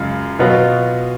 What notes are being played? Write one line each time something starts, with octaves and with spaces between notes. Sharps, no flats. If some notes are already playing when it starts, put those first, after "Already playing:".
Already playing: F#2 C#3 G#3 F4
B2 F#3 B3 F4